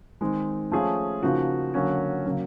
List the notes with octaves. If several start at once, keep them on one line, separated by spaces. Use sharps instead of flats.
D#3 G#3 C4
F3 A3 C#4 F4 G#4
C#3 F3 A#3 D#4 F#4
D3 F#3 A#3 C#4 F#4
C#3 F#3 A#3